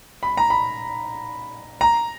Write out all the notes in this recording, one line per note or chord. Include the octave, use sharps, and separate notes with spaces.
B5
A#5
B5
A#5